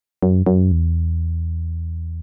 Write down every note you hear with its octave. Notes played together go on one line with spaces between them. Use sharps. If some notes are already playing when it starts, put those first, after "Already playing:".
F#2
F#2
E2